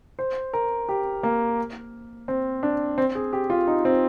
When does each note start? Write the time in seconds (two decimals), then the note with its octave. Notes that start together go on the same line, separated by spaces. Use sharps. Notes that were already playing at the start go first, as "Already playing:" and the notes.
0.19 C5
0.53 A#4
0.89 G4
1.23 A#3
2.28 C4
2.63 D4
2.98 C4
3.15 G#4
3.33 G4
3.50 F4
3.67 D#4
3.85 C4